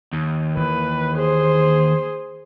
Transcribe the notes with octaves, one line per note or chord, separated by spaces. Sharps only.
D#2
D#3 E3 A#3 B4
G#4 C5